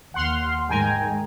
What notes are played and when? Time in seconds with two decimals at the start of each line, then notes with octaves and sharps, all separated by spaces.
0.14 D#2 F#5 C6 F6
0.69 G#2 D#3 G#3 G5 G#5 A#5